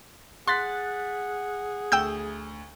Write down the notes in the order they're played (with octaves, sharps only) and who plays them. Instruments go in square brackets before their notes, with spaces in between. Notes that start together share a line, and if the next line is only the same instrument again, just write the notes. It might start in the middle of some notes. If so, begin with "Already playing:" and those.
[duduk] G#4 [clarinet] F#5 [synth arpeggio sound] C6 [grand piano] F#6 A6 B6
[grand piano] D2 [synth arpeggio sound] G5 E6 G6